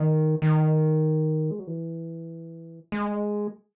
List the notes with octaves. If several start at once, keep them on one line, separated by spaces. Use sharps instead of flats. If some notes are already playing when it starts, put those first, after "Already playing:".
Already playing: D#3
D#3
G#3
F#3
E3
G#3